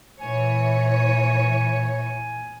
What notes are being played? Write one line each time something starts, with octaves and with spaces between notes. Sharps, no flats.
A#2 E3 C#5 G#5